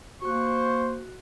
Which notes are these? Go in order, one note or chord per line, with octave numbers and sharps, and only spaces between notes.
A#3 F#4 C5 C#6 F#6